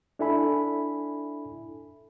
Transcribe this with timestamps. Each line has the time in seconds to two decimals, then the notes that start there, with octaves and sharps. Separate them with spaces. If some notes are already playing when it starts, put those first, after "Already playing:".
0.19 D4 E4 A4 E5 G#5 B5